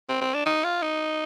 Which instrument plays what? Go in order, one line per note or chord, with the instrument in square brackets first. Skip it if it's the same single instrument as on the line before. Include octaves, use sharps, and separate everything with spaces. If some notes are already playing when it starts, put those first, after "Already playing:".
[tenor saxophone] C4
C4
D4
D#4
F4
D#4